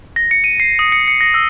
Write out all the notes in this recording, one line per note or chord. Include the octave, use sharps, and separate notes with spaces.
A#6
C#7
D#7
C7
D#6
C#7
C#7
A#6
E6